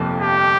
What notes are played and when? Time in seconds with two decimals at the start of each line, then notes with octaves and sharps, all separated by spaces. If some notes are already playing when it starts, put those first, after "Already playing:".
Already playing: G1 F2 C3 F3 A#3
0.21 G4